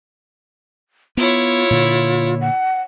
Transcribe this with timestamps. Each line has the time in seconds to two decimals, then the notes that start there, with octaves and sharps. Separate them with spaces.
1.17 B3 E4 F4 C#5
1.71 A#2 D3
2.41 F#5